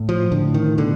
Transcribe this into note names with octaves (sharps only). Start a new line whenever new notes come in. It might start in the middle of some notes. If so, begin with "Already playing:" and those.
Already playing: A2
F3
A2 D3
D#3
B2 D3